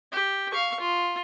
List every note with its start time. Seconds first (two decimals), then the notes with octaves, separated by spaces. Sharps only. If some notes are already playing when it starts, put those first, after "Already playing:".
0.12 G4
0.51 F5 C#6
0.80 F4